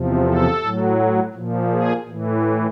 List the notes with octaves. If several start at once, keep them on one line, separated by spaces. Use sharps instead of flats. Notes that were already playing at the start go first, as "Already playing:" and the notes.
Already playing: E2 C3 F3
A4
A2 F#3
A#2 F3
G#4
A2 E3